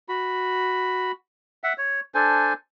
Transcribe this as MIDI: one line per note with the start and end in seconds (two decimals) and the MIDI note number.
0.09 1.12 66
0.09 1.12 83
1.64 1.73 76
1.64 1.73 78
1.78 2.00 73
2.15 2.53 62
2.15 2.53 69
2.15 2.53 72
2.15 2.53 80